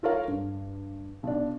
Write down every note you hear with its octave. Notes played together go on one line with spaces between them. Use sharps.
F4 A4 A#4 C#5 F5
G2
B1 D4